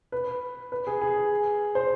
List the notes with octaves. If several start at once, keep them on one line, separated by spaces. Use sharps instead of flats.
B4
B4
G#4
G#4
C5